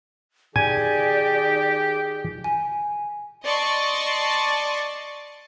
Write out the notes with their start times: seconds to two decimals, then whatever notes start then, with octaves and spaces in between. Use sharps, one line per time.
0.56 D#3 G4 G#4 D5 G#5
2.44 G#5
3.44 D5 D#5 A5 C6 C#6